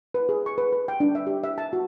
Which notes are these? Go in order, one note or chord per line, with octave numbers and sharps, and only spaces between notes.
B4
G#4
C#6
B4
B4
G5
D4
E5
G4
E5
A5
F#4